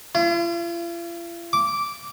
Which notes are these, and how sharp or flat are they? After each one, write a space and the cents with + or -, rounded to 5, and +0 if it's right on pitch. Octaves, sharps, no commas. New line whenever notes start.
F4 -45
D6 -10